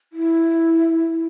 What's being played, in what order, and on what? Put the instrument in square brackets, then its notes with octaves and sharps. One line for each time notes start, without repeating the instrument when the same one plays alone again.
[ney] E4